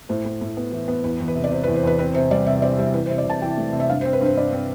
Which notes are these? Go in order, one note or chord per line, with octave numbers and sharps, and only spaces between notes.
A2 C5
A2
A2
B3
E3
B3
E2 B4
E2
B4
C3
D5
C3 C5
B4
E2
C5
E2 B4
C4 B4
C3 C5
G3 D5
C3 E5
C4 D5
G3 E5
E3 B4
C5
C3
D5
C3 A5
E3 G5
A3
C3
E5
G2 F5
C5
C4
B4
G2 C5
G2 D5
C4